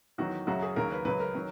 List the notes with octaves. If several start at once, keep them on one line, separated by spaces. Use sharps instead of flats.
E2 D#3 F#3 F#4
F#2 C#3 F#3 F#4
G#4
D#2 C#3 F#3 A#4
B4
C#2 C#3 F#3 B4
A#4
D#3 F#3